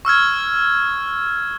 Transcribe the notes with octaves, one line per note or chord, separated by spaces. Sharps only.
C#6 E6 F6 G#6